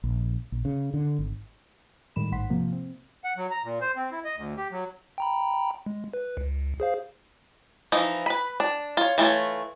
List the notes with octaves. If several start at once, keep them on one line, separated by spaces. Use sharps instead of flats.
A#1
A#1
C#3
D3
G#1
A2 D#3 G3 G#3 B5 E7
A1 G#2 F#5 C6 B6
C3 F3 A#3
C4
F#5
F#3
A#5
A#2
C5
C4
E4
D#5
D2
G4
F#3
G5 A#5 B5
G#3
B4
C#2
G#4 C5 F5
E3 F3 D#4
B4 B5
D4
F4 C#5
E3 A3 F4 C#5